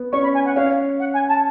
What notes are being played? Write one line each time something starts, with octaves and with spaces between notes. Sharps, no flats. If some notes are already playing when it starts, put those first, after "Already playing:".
Already playing: B3
C#4 C#6
B5
G#5
F#5
C#4 F5
F#5
G#5
A5